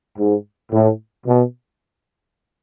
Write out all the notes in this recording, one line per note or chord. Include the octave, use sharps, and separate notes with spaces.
G#2
A2
B2